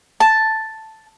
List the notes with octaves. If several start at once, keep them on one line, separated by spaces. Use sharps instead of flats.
A5